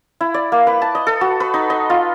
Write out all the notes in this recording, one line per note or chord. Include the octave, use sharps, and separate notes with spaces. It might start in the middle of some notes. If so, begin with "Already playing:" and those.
E4
D5
A#3
B4
A5
D#5
A4
F#4
B4
D#4
D#5
F4